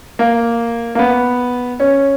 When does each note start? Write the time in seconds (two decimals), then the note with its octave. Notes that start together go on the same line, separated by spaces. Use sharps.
0.19 A#3
0.95 A#3
0.99 B3
1.80 C#4